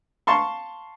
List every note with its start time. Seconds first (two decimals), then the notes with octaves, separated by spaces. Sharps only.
0.27 F5 A5 C6 C#6